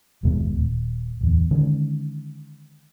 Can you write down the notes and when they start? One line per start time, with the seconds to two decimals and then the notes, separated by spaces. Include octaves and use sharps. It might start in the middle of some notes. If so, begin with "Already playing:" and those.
0.23 F#1 D#2 B2 G#3
0.56 D#1
1.21 D1 E2
1.51 D3 D#3 G#3 C#4